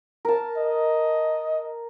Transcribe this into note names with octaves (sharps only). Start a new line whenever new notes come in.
A#4 A5
D#5